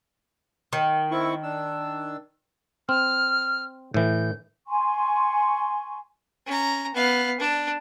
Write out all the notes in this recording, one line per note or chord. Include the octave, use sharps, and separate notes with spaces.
D#3
C4 E4 C#6
D4 E6
C4 F6
A2 E3 G6
G#5 C6 C#6
C#4 A#5
B3 F5
D4